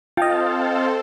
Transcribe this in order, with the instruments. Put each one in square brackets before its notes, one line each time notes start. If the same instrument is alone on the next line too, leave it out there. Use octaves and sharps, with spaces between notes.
[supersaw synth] C4 A4 C5 [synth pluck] F4 [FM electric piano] D#5 G5 [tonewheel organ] F5 A5